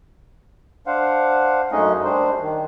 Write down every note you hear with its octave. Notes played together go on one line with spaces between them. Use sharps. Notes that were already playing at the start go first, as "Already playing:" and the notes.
D4 C5 F5 F#5
F#2 G#3 A3 C#4 D#4 D#5
G3 D4 C5
D#3